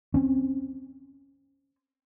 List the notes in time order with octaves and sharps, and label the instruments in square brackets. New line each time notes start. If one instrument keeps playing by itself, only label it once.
[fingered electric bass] C4 C#4